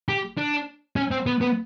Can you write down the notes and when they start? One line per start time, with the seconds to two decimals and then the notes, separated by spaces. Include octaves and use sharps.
0.09 G4
0.38 D4
0.96 C#4
1.11 C4
1.26 B3
1.41 B3